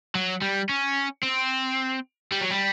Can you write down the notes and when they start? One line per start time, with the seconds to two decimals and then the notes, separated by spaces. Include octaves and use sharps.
0.15 F#3
0.42 G3
0.69 C#4
1.23 C4
2.32 G3
2.41 F#3
2.51 G3